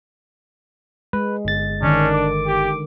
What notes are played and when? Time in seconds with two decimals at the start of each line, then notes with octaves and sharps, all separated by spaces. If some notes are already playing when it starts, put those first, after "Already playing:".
1.13 G#3 B4
1.45 G1 A6
1.83 D3 D#3 C#4 D4
2.14 D6
2.47 G4